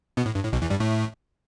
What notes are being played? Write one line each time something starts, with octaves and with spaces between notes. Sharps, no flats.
B2 B3
A2
G2
A2
B1 B2
E2 E3
G2 G3
A2 A3